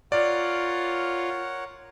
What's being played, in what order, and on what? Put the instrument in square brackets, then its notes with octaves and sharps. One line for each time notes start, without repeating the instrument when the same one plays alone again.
[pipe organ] F4 [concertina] A#4 C#5 F#5 [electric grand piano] D5